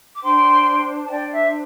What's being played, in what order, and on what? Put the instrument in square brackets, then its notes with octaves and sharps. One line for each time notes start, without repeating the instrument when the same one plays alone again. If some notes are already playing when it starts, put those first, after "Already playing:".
[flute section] D6
D4 C5 G5 C6
A5
D4 C5 D5 G5
E5